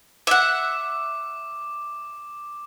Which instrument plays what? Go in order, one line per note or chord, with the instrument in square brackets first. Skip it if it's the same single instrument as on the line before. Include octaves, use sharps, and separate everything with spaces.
[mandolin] E5 F#5 [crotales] D6